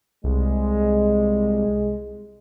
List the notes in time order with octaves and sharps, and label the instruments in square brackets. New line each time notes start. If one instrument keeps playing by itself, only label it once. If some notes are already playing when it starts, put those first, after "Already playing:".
[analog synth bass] C2 [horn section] G#3